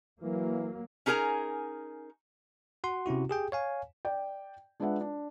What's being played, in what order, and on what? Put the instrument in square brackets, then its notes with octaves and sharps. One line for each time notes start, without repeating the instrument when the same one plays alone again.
[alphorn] E3 [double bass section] F#3 A#3
[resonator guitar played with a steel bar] C#4 D#4 G#4 A#4 G#5 A#5
[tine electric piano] F#4 F#5 C6
C3 C#4 E4 F#4
G4 G#4 G5
C#5 F5 G#5
[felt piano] D5 G5
G#3 D4 F4 B4 E5 F#5
D4